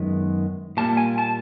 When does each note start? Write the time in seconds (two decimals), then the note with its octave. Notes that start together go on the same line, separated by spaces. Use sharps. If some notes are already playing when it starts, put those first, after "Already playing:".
Already playing: F#2 D#3 G#3 B3
0.77 A#2 G3 A#3 A5
0.97 G#5
1.18 A5